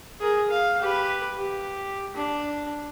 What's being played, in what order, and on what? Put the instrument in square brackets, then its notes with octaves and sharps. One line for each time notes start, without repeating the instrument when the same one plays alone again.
[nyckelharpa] G#4 A#4
F5
G4 B4
G4
D4